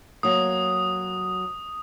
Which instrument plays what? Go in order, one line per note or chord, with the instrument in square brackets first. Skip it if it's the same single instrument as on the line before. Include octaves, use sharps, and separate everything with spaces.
[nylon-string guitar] F#3 A#3 [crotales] D#6